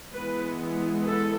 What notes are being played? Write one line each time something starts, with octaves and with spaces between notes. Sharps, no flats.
E3 G#3 B3 B4
A4